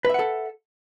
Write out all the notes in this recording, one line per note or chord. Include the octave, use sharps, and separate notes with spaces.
A4 B4 E5 F#5